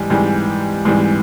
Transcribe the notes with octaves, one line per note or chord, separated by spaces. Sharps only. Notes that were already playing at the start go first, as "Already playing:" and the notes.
Already playing: G#2 E3 G3
G#2 E3 G3
G#2 E3 G3